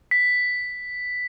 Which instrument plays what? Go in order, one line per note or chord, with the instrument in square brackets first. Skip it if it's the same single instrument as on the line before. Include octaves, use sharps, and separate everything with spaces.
[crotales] B6